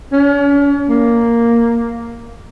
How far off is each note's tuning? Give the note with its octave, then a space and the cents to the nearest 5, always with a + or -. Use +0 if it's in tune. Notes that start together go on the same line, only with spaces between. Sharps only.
C#4 +40
A#3 +0